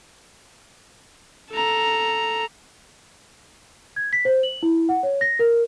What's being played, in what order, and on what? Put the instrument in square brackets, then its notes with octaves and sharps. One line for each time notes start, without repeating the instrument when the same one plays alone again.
[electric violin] A4 A#5
[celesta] G#6
B6
C5
F#7
E4
F#5
C#5
A#6
A#4